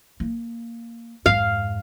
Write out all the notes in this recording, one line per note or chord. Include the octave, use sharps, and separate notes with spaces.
A#3
F2 G#2 F5